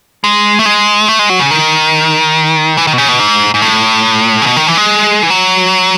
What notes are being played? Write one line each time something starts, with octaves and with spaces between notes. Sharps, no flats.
G#3
A3
G#3
A3
G#3
F#3
C#3
D#3
E3
D#3
B2
C#3
B2
G#2
G#2
A2
C#3
B2
D#3
E3
G#3
E3
F#3